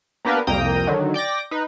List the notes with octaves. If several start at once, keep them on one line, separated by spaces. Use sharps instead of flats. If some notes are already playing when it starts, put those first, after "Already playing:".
A#3 B3 D4 G4 A#4 B4
C2 F2 A#3 G5 A#5 D#6
D3 D#3 F#3
D5 G5 D6 A#6
D#4 B4